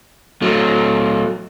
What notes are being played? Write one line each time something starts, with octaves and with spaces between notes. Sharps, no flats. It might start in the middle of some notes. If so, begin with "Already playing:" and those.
F#3 A3